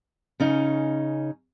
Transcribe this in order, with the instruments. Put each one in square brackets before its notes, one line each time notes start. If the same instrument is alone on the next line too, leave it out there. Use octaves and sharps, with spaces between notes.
[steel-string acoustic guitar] C#3 C#4 D#4